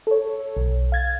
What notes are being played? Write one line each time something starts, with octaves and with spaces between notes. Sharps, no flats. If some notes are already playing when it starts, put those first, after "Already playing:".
A4 C#5
B1
F5 G#6 A6